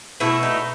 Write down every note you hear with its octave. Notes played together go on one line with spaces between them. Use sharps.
B2 A3 E4
D#4